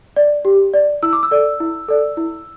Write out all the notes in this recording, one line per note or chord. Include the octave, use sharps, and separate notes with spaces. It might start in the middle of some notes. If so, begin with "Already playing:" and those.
D5
G4
D5
E4 E6
D6
E6
A4 D5
E4
A4 D5
E4